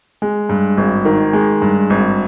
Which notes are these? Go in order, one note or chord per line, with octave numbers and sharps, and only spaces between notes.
G#3
G2
G#1
D#3
G#3
G2
G#1